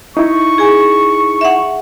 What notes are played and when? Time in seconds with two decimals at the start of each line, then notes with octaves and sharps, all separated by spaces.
0.17 D#4 E4 C#6
0.58 G#4 G#5
1.41 E5 F#5